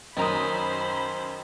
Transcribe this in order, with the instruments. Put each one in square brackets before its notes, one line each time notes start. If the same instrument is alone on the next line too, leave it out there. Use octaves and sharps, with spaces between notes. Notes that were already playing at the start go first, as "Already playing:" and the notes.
[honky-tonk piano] F#2 A#5 D#6 [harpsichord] D#3 [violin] C5 [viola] B5